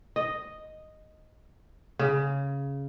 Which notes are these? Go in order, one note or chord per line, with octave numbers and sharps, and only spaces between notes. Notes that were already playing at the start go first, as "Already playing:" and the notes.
D#5
C#3